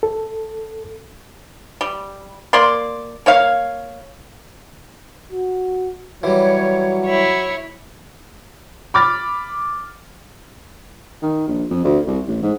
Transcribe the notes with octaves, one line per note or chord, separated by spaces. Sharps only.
A4
G3
A#3 D5 C6
A#3 C#5 F5
F#4
E3 F#3 G3 C#5
E4 C#5
B5 D6 F6 A6
D#3
A#1
F2
D2
C2
A1
G#2